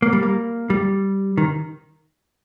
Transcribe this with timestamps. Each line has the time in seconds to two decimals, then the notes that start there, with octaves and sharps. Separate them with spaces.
0.02 A#3
0.13 G3
0.23 A#3
0.70 G3
1.38 D#3